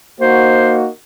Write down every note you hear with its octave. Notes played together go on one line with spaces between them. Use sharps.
A#3 D#4 F#4 C5